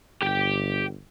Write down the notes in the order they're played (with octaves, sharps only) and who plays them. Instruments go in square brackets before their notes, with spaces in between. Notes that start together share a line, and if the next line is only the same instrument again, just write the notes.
[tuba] G1 [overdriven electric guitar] G4 G5